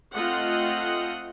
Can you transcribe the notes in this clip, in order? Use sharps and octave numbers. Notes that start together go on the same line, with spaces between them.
A3 C4 F4 D#5 F#5